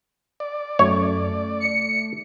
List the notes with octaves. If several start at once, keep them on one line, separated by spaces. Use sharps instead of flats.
D5
F#2 A3 C#5
C#7